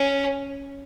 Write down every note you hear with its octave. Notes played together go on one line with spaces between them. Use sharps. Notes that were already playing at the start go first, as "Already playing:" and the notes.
Already playing: C#4